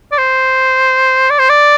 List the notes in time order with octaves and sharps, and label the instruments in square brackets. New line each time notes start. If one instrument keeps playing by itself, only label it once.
[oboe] D5
C5
D5
C5
D5